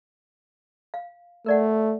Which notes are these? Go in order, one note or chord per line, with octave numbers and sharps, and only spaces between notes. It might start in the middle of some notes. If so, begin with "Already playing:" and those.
F5
A3 A#4 D5 F#5